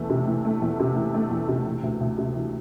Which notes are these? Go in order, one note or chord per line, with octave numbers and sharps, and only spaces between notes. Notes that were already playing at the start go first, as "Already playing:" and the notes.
Already playing: E2 E3 A3
C3
E3
A3
E2
C3
E3
A3
E2
C3
E3
D2
D2
C3
E3